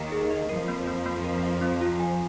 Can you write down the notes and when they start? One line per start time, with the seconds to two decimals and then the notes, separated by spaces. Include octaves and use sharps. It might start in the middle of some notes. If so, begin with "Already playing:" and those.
Already playing: D#2 D#3
0.12 G#4
0.31 D#5
0.49 F2 F3 A#4
0.68 A#3
0.87 A#3
1.06 A#3
1.24 A#4
1.43 F5
1.61 C4
1.81 F4
2.00 G#5